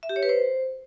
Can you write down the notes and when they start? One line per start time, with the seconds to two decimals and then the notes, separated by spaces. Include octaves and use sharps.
0.03 E5
0.09 G4
0.16 C#5
0.23 B4
0.29 C5